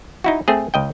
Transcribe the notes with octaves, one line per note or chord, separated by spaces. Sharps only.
D#4 E4 F#4
A3 C4 G#4
C#2 D#5 G5